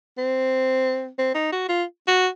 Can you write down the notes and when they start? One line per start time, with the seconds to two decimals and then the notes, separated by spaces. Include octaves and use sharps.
0.18 C4
1.18 C4
1.35 D#4
1.52 F#4
1.68 F4
2.07 F#4